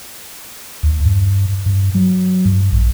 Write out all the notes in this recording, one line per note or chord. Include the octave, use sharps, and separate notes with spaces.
D#2
G2
G2
F#3
G2
A#1